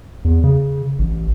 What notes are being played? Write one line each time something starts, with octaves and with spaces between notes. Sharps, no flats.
E2
C#3
A1